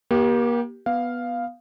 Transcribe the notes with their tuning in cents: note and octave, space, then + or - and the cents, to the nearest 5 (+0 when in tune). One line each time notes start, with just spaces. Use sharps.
A#3 +35 G4 -5
B3 +0 F5 +0